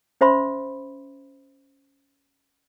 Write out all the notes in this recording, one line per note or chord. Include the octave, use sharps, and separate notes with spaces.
C#4 C5 E5 B5 C6